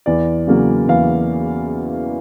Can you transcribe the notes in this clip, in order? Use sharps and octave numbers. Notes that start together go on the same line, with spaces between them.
E2 D5
C#3 F#3 A#3
E2 F5